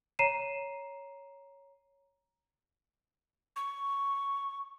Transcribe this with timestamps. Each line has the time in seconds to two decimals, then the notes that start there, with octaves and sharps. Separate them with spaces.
0.19 C#5 A#5 C7 D#7 E7
3.56 C#6